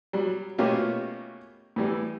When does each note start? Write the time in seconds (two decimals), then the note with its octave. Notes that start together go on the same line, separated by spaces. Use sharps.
0.13 F#3 G3
0.58 B2 A3 A#3 C#4 F4 G4
1.76 A2 E3 G3